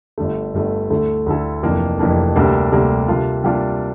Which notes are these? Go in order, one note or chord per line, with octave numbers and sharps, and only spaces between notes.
G1 G2 D3 A3
G1 G2 D3 A3
D2 D3 A3 E4 A4
D2 D3 A3 E4 A4
F1 F2 E3 A#3 D4
F1 F2 E3 A#3 D4
D2 C3 G3 A#3 D4
D2 C3 G3 A#3 D4
C3 G3 A#3 D4 F4
C3 G3 A#3 D4 F4